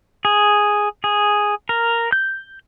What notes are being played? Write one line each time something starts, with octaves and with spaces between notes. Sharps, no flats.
G#4
G#4
A#4
G6